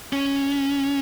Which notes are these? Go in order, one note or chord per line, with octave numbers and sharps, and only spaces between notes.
C#4